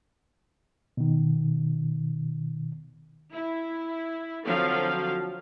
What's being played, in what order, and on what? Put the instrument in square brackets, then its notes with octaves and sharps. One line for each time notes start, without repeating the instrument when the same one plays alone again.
[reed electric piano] B2 D#3
[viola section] E4
D3 F3 F#3 C4 F5